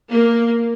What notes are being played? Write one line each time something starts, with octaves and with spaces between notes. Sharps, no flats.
A#3